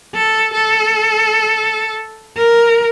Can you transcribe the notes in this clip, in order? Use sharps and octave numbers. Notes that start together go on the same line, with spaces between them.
A4
A4
A#4